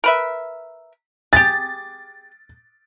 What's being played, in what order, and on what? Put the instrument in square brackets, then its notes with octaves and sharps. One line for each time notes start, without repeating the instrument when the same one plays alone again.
[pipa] A#4 B4 E5
[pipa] G4 G#4 [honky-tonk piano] A6